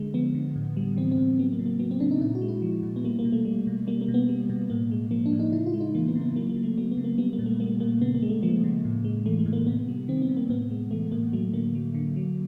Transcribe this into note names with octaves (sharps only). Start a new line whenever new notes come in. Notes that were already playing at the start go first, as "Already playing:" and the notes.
Already playing: D3 G#3
F3 B3
D3
A2
G3
E3 C4
C4
A2
F#3 B3
A#3
C#3
A#3
F#3 B3
C4
C#3 D4
D#4
A#2 E4
F#4
G#3
E4
F3
A#2
B3
G3 A#3
A#3
B2
A3
G3
B2
G3 A#3
A#3
B2
B3
G3
B2
A2 A#3
G#3
F3 A#3
D4
A2
D#4
C#3 E4
F4
G#3
D#4
E3 A#3
B3
C#3
B3
F#3 A#3
A#3
C#3
A3
F#3 B3
B3
C#3
A#3
G3 B3
A#3
A#2
A3
G3 A#3
A#2 A#3
C#3 B3
A#3
G#3
A3
F3 A#3
C#3
A2
G#3
E3 A3
A3
A2
A#3
C3 B3
G3
D#3 C4
B3
C3
A#3
A2 B3
G#3
E3 A3
A2 A#3
F#3 A3
D3 A#3
F#3
D3
F#3